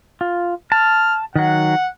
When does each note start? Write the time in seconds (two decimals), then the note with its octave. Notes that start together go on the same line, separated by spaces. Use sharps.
0.21 F4
0.72 A5 F6
1.36 D#3 F#3 F#5